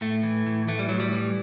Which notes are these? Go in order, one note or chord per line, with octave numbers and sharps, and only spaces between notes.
A2 A3
E3
A2
E3 A3
G3
A2 F#3
G3
E3